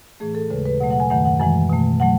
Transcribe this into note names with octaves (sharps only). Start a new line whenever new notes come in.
A2 E3 A3 G#4
A4
D#2 C#3 G#3 B4
B4
B2 F#3 A3 F#5
F#5
G#5
F#2 D#3 A3 F#5
F#5
F#2 E3 G#3 G#5
B2 A3
F#3 A3 F#5